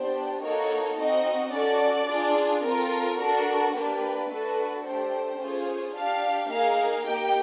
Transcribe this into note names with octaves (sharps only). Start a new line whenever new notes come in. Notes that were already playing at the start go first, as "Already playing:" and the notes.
Already playing: B3 D4 G4 C5
A#3 D#4 F#4 A4 C#5
C4 D#4 F#4 D#5
C#4 F#4 A4 D5
D4 F4 G#4
C4 F4 A4 A#4
D4 F#4 A4
A#3 D4 G4 B4
A3 D4 F#4 A4
A3 D4 G4 C5
C#4 F4 G#4
D4 G4 F5
A#3 D#4 G#4 F5
A#3 D#4 G4 G5